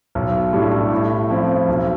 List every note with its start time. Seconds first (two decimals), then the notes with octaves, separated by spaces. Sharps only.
0.15 B1
0.53 A2 G3 D4
0.92 A2
1.29 F3 C4 E4
1.69 B1